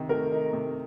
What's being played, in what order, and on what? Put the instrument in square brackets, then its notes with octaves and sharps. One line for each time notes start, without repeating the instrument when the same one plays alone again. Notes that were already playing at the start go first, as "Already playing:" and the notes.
Already playing: [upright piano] C3 D#3
[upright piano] A3 [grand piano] A#4
[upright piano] D#4
C3